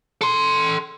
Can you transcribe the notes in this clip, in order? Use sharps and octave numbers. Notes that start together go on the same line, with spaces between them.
A4 C6